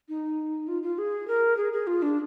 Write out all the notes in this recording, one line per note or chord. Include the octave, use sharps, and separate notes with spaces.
D#4
F4
F4
G#4
A#4
G#4
G#4
F4
D4